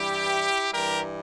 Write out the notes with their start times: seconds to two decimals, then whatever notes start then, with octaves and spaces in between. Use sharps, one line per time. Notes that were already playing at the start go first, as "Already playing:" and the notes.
Already playing: G2 E3 G3 E4 G4
0.73 G2 E3 G3 G4 A#4